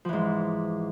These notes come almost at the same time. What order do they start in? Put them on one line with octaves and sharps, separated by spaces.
F3 E3 G#2